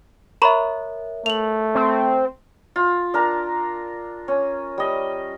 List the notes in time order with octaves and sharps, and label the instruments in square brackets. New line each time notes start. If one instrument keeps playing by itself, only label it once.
[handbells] A#4 C#5 E5 [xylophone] A#5 B5 C#6
[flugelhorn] A3 [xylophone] F7 F#7
[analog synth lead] C4
[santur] F4
D4 A#4 A#5
C#4
G3 D#5